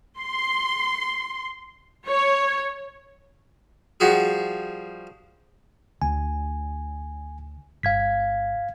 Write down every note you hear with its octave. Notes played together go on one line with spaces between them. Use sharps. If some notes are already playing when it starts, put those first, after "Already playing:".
C6
C#5
F3 G3 F#4 G#4
D2 G#5
G1 F5 G#6 B6